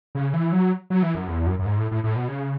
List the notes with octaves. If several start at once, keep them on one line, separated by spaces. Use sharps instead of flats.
C#3
E3
F#3
F#3
E3
F#2
E2
F#2
F#2
G#2
A2
A2
A2
B2
C#3